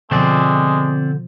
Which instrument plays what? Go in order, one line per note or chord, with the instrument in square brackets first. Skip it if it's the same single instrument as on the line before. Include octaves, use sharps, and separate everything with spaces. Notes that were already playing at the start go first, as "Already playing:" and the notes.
[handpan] B2 F3 [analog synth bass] D3 [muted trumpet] G#3 [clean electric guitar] C4 D5